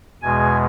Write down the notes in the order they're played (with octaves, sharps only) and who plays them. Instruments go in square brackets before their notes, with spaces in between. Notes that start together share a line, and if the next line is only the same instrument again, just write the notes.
[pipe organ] E2 B2 G#3 G#5